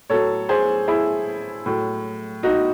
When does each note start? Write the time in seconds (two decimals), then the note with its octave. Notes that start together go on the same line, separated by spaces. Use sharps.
0.10 A2 F#3 A4 C#5
0.49 G#4 C5
0.88 E4 G#4
1.66 A2 F#3
2.43 D#4 F#4